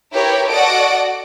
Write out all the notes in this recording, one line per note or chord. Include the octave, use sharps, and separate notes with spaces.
E4 G4 A#4 B4 C#5
F#4 A4 D5 D#5 F#5 D7